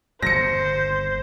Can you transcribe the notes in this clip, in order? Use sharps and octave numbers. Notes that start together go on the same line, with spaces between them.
G1 D#2 C5 A#6 C#7